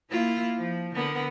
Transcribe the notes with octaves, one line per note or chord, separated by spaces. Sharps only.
A#3 E4 F4
F3
D3 B3 A#4